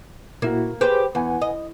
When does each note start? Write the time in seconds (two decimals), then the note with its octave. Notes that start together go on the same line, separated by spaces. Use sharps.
0.42 A#2 A#3 E4 F#4
0.81 G4 G#4 B4 C5 G6
1.15 E2 B4 F#5 G#5
1.42 D#5